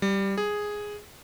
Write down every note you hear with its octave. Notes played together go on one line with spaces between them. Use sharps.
G3
G#4